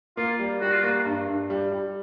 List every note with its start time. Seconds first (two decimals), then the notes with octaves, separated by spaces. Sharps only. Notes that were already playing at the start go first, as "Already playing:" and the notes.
0.17 A#3 F4
0.39 G3
0.61 G3 F#4
0.72 F4
0.83 A#3 F#4
1.05 G2
1.28 G2
1.50 G3
1.72 G3